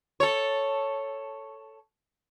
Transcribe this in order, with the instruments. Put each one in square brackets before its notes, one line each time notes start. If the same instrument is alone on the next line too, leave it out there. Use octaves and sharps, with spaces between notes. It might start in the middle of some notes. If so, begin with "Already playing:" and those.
[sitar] A4 C#5